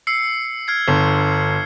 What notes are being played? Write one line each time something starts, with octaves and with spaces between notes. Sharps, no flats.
E6 C7 C#7
F6 G#6 C7
G1